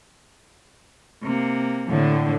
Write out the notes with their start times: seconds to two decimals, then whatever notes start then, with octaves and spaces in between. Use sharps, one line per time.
1.22 C3 A#3
1.87 A2 D3